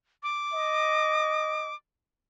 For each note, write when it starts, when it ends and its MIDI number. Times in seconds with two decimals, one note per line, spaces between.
0.23 1.75 86
0.53 1.73 75